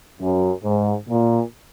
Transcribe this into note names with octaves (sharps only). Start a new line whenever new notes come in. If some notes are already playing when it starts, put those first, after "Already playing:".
F#2
G#2
A#2